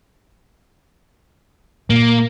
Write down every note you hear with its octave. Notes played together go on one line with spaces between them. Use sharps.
A#2 A#3